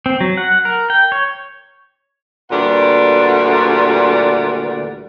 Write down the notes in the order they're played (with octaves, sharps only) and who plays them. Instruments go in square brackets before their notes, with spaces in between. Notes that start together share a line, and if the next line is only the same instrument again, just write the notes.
[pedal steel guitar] C4
F#3
F#5
A#4
G5
C#5
[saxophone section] D2 A#2 E3 G3 D5 F#5